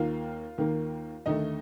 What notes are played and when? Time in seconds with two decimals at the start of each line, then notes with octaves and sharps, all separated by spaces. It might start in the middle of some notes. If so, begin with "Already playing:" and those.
Already playing: D#2 D#3 A#3 F4 F5
0.58 D#2 D#3 A#3
1.26 D#2 D3 A3 D#4 D#5